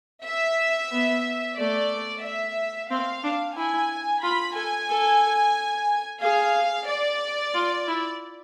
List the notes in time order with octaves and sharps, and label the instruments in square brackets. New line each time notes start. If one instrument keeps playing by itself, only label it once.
[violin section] E5
[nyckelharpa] B3
[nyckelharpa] A3 [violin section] D5
[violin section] E5
[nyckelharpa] C4 [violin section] F5
[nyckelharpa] D4
[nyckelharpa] E4 [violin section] G#5
[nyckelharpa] F4 [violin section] B5
[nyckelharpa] A4 [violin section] G#5
[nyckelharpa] A4
[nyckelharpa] G#4 [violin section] F5
[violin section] D5
[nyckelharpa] F4
E4